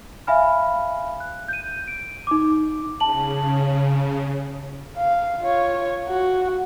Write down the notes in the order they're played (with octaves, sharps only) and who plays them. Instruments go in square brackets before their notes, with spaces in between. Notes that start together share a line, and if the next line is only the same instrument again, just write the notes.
[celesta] E5 F5 G#5 B5 F6
F#6
G6 D#7
D7
D#4 D6
[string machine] C#3 [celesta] A5 F#7
[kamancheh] F5
F4 C#5
F#4